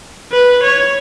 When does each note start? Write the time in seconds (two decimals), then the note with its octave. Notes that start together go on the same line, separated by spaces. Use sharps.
0.32 B4
0.63 C#5